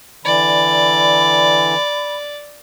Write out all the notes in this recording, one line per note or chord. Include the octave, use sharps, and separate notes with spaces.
D3 E3 D5 B5